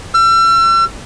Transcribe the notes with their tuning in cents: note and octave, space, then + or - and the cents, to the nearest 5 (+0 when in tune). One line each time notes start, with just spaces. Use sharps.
E6 +40